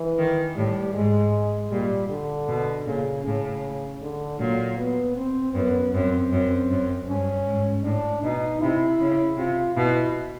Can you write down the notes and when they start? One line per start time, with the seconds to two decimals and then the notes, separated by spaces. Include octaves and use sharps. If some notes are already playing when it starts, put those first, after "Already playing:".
Already playing: E3
0.18 D#3
0.56 A2 G3
0.94 G#2 G#3
1.70 A#2 G3
2.09 D3
2.48 B2
2.85 A#2 C#3
3.25 A2 C#3
4.01 D3
4.39 A#2 F#3
4.77 B3
5.16 C4
5.54 F#2 B3
5.93 F#2 C4
6.31 F#2
6.69 F#2
7.08 G2 C#4
7.46 G#2
7.84 A2 D4
8.23 B2 D#4
8.61 C3 E4
9.00 C#3
9.37 C3 F4
9.76 B2 E4